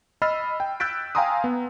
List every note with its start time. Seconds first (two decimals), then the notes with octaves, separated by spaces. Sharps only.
0.22 D#5 B5 E6 F6 A6 C7
0.60 G5
0.80 E6 F#6 G6 A6 B6 D7
1.15 F5 G5 G#5 A#5 C6 D#6
1.44 B3